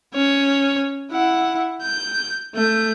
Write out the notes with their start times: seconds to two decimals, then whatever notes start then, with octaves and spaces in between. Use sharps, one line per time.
0.14 C#4 C#5
1.11 E4 F#5
1.82 G6
2.55 A3 G6